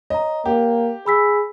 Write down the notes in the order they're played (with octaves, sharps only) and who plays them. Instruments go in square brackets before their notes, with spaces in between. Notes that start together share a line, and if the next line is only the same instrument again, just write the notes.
[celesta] C#5 A#5 [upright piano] D#5
[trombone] A#3 [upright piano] G4
[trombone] G#4 [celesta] B5 E6 B6